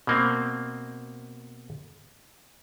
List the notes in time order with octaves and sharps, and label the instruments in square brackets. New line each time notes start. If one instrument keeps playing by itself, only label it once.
[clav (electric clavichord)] B2 A#3 C4